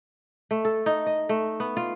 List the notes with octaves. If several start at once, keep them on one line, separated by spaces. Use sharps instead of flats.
A3
A4
D#4
D#5
A3
B3
F4